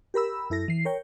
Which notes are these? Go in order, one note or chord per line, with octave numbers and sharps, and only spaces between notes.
G4 A#4 B5 E6
F#2 E4 A4 A#6
E3 C7
A#4 C#5 G5